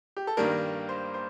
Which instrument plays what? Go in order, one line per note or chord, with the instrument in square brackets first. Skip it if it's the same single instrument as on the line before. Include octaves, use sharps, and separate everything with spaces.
[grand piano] G4
A4
G2 D#3 G3 A#3 A#4
C5
C5